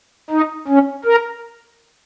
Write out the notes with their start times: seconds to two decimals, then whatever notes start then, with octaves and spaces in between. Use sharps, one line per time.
0.30 D#4
0.68 C#4
1.05 A#4